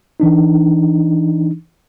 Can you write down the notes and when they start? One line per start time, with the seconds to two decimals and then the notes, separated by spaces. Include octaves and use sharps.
0.20 E3 D4 D#4